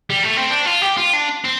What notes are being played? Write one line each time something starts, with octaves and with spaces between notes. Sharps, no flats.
G3
A3
C4
D4
F4
G4
F4
D4
C4